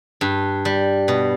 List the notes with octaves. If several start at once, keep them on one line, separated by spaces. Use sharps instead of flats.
G2
G3
B2